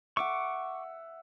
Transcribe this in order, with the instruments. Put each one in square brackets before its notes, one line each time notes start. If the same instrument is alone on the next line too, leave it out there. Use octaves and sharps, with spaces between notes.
[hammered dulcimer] E5 F#5 [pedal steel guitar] C#6 D6